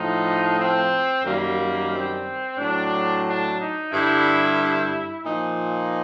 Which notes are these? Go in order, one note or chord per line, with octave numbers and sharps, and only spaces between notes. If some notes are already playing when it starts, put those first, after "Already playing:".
Already playing: A2 F3 D#4
C4
F#2 D#3 G3 A#3
C4
A2 F#3 D4
D4
D#4
G2 D3 G3 E4
A#2 F3 D#4